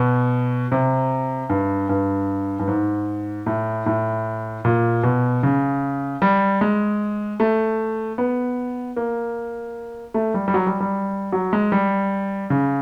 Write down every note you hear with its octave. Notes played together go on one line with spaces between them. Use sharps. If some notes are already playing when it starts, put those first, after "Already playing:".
Already playing: B2
C3
G2
G2
G2
G#2
A2
A2
A#2
B2
C#3
G3
G#3
A3
B3
A#3
A3
G3
G3
F#3
G3
G3
F#3
G#3
G3
C#3